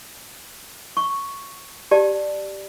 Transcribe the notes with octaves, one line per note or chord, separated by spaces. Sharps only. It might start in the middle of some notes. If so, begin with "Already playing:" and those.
C#6
G4 D5 A5